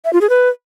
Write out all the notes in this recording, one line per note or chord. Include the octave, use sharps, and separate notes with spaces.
E5
F4
G#4
B4